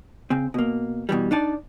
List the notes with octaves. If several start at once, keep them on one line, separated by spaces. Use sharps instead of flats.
C#3 C4
B2 A#3
B2 E3 G3
D4 D#4 D5 A5